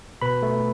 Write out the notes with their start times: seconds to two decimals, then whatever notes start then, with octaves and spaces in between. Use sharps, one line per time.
0.22 B2 B4 B5
0.43 A3